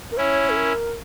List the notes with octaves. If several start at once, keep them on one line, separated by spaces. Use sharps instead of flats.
A#4
C#4 E4 C#5
A4
A#4